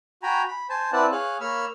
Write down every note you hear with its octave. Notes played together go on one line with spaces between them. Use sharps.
F#4 G5 G#5 A#5 B5
B5
C5 G#5 A5
C4 E4 B4 D5 F#5 A5
G#4 C#5 F5 G#5 F#6
A#3 C#5 B5 E6 F6